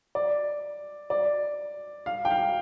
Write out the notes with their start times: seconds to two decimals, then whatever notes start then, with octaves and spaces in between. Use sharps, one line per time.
0.15 D5
1.10 D5
2.06 F5
2.25 G5
2.31 F5